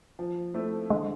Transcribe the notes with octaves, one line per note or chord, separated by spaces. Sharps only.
F3
A3 C4 E4
D3 G#3